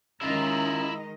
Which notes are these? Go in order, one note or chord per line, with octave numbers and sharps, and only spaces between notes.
D#3 G#3 C#4 E4 F4 D#5 A#5